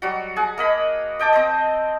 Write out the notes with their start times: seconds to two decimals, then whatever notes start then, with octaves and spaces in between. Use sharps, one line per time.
0.02 F#3 G3 F#4
0.36 G#4 F#5
0.58 A#3 D#5 B5
1.19 D#5 G5 A5 D6
1.33 C4 C5 D#5